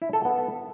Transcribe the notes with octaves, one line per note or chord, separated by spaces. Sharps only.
E4
A4
B3